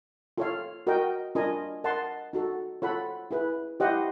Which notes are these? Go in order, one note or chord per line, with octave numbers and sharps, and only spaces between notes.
F4 A4 C#5 F5
F#4 A#4 D#5 G5
D4 F4 A#4 D#5 G#5
A#4 D#5 F#5 A5 C6
D#4 F#4 A4
F4 A4 C#5 F#5 B5
E4 G#4 B4
E4 G4 C5 D#5 F#5